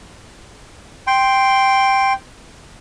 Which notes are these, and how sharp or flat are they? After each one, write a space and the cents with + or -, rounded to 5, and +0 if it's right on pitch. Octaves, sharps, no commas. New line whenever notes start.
G5 +0 C6 +0